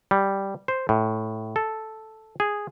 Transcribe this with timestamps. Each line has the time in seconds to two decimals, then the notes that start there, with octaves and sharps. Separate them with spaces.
0.11 G3
0.68 C5
0.89 A2
1.56 A4
2.40 G#4